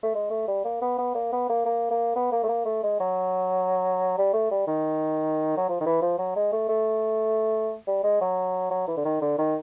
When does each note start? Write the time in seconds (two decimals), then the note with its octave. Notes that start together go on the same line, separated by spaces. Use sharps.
0.03 A3
0.15 G#3
0.30 A3
0.48 G3
0.64 A#3
0.81 B3
0.98 B3
1.14 A#3
1.32 B3
1.49 A#3
1.65 A#3
1.91 A#3
2.16 B3
2.32 A#3
2.43 A3
2.49 A#3
2.65 A3
2.83 G#3
3.00 F#3
4.18 G3
4.33 A3
4.51 G3
4.67 D#3
5.57 F#3
5.68 F3
5.80 D#3
5.86 E3
6.02 F3
6.18 F#3
6.36 G#3
6.52 A3
6.68 A3
7.87 G3
8.03 G#3
8.21 F#3
8.71 F#3
8.87 E3
8.97 D3
9.04 D#3
9.21 D3
9.38 D#3